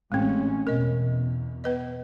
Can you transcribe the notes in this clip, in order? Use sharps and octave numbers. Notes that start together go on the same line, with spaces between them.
A1 G#3 A3 C4 C#4
E2 B2 A#4 D#5
B3 B4 D#5